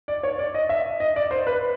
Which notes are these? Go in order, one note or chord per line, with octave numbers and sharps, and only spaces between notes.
D5
C#5
D5
D#5
E5
D#5
D5
C5
B4